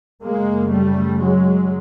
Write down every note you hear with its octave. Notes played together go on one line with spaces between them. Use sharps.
F#2 C#3 G#3 A#3
G3 A3
F#3 G#3